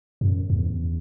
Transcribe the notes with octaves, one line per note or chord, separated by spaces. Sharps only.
F#2
E2